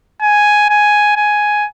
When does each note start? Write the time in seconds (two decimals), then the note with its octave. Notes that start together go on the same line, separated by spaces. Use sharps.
0.22 G#5
0.70 G#5
1.17 G#5